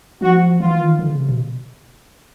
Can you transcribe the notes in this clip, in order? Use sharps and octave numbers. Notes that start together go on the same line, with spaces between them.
F3 F#4
E3 F4
D#3
D3
C#3
C3
B2